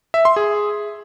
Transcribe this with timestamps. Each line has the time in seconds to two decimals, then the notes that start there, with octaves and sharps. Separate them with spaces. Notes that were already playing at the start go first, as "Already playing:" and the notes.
0.14 E5
0.25 C6
0.36 G#4